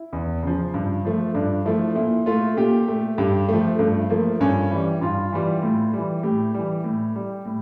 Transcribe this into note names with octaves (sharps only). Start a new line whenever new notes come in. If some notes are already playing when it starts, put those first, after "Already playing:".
Already playing: E4
E2
C#3 F3
G2
F3 A3
G2 D4
F3 A3 E4
A#2 E4
A3 F4
A#2 G4
A3
G2 G4
F3 A3
G2 A3
F3 A3 A#3
G2 C#4
E3 G3
G2 F4
E3 G3
A2
E3 G3
A2 G4
E3 G3
A2
G3
A2